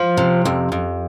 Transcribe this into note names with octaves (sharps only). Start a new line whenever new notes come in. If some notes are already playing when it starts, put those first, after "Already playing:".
Already playing: F3
C3
F2
F2